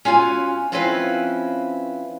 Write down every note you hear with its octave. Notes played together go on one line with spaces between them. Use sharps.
C#4 F4 F#4 G#5
F3 C4 C#4 E4 B4 F5